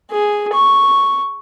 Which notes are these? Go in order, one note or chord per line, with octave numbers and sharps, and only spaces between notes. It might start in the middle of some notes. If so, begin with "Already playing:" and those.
G#4
C#6